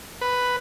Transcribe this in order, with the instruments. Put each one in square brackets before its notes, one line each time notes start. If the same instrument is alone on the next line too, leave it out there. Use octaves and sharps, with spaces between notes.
[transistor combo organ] B4